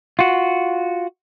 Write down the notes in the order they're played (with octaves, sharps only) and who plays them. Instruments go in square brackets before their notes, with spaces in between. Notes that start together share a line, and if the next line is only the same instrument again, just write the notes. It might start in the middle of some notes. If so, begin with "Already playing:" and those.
[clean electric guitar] F4 F#4